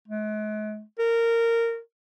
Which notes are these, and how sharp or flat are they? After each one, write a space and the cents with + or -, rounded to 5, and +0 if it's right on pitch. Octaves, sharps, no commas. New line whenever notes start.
G#3 +45
A#4 -15